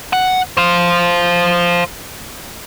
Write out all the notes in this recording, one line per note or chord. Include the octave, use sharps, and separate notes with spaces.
F#5
C5 F5